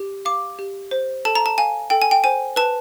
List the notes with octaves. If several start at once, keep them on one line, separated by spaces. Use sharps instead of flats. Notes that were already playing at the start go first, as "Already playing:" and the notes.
Already playing: G4
F5 D6
G4
C5
A4 A5
A#5
A5
F5 G#5
A4 G5
G#5
G5
C5 G#5
B4 A5